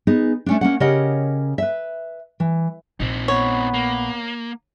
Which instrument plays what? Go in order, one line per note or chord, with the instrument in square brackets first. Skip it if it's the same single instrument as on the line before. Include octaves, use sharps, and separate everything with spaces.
[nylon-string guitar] B3 D#4 G#4
A3 C#4 D4
A#3 C#4 F#5
C#3 G4 A#4 C#5 D#5 F#5
B4 E5
E3
[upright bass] A#1 [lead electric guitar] C4 D#4
[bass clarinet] B3 [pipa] C#5
[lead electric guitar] A#3